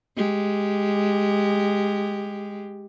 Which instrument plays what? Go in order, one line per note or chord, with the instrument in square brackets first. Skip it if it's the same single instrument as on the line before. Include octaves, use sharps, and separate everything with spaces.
[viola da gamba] G#3 G4